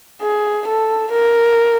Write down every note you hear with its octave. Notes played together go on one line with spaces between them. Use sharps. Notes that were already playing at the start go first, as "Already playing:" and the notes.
G#4
A4
A#4